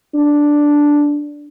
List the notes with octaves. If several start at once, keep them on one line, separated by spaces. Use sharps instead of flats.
D4